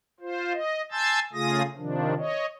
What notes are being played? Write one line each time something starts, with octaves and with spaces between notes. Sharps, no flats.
F4 C5
D#5
G#5 A5 C6 E6 G6 A6
C#3 A3 F4 G#4 D#6 A#6
C3 D#3 F3 D4
C#5 D#5